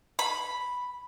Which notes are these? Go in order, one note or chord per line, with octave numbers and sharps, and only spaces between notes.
B5